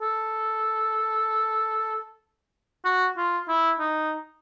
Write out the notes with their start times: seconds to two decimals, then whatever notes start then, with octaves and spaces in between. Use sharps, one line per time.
0.01 A4
2.85 F#4
3.17 F4
3.49 E4
3.79 D#4